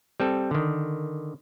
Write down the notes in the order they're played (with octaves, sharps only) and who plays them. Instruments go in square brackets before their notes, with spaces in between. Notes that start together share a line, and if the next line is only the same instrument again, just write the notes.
[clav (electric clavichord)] G3 C4 A4
D3 D#3